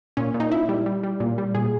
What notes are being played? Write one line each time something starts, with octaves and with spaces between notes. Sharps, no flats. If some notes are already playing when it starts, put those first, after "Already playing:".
A#2 C#4
A#2
D#4
A#2 E4
G3
G3
G3
A#2
G3
A#2 G#4